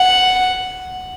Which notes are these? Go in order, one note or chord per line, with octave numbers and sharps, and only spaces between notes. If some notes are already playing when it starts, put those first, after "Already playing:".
Already playing: F#5